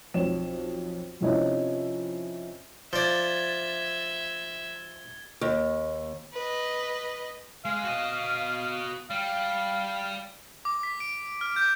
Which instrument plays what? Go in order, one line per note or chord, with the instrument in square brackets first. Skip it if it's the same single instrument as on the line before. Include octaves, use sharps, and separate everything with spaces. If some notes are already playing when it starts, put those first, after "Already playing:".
[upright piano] B1 F2 C#5 E7
F2 C3 F3 C#4 D#4 E4
[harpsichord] F3 D5 [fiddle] E5 [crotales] G#6 A6 G7
[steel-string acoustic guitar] D#2
[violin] B4 D#5
[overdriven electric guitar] G#3 [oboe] F5
[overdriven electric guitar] F#4 D#5
[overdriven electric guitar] G3 [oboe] F5
[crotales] D6
B6
D7
F6
G6